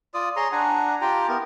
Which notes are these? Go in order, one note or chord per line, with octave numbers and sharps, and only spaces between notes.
F4 D5 D#6
G#4 C#5 A#5 C6
D4 F#5 G#5 A#5
F4 G4 G5 A#5
B3 E4 A#4